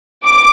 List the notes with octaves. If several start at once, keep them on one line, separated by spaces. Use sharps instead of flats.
D6